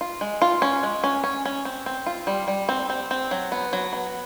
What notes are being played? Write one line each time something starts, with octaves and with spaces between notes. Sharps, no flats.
F4
G#3
F4
C#4
G#3
C#4
C#4
C#4
C4
C4
F4
G3
G3
C4
C4
C4
F#3
B3
F#3
B3